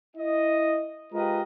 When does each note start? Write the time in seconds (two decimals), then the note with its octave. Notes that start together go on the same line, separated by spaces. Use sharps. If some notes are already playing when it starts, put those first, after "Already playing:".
0.17 E4 D#5
1.13 G#3 F4 G4 A#4 B4 D#5